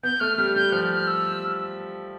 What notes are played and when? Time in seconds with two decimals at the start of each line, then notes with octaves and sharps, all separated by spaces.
0.03 B3 G6
0.20 A3 F6
0.38 G3 F6
0.56 G3 G6
0.72 F3 F6
0.95 F6
1.07 E6